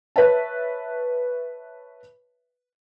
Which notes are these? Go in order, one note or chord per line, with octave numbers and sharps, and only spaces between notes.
B4 C#5 E5 A5